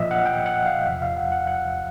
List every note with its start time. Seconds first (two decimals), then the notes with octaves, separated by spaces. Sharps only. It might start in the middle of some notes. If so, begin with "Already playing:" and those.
Already playing: A#2 F3 D#5 E5
0.11 F#5
0.26 G5
0.46 F#5
0.66 F5
0.86 E2 C3 F3 E5
1.02 F5
1.17 F#5
1.32 F#5
1.47 F#5